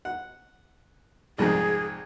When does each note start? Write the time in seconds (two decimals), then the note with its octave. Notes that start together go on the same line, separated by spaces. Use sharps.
0.05 F#5
1.38 C2 F2 G#2 G#4